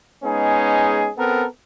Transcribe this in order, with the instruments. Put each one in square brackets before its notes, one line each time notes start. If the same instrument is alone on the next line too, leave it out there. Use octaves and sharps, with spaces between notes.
[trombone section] G#3 B3 C#4 D#4 G#4
B3 C4 A4 A#4